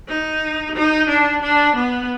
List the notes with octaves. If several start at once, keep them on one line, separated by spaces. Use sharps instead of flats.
D#4
D#4
D4
D4
B3